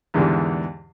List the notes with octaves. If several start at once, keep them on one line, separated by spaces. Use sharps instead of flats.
E2 G#2 D3 E3 G3 G#3